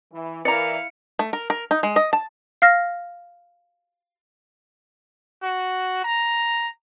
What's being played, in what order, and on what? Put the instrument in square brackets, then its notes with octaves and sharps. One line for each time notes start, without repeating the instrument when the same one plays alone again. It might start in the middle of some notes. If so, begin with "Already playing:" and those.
[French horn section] E3
[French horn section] E3 A#4 [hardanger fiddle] E4 F5 [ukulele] D5 A#5 [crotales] C#7
[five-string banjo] A3
A#4
A#4
D#4
G#3
D#5
A5
[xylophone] F5 F6 A#6
[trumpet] F#4
A#5